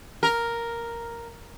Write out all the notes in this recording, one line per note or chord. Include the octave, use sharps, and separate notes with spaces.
A#4